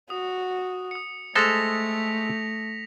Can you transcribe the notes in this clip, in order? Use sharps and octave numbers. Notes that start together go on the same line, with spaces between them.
F#4 D#6
D#6 C#7
G#3 A3 A4 C5 A#6 B6 F7